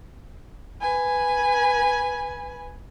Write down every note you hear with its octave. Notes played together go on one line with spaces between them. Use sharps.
B4 G#5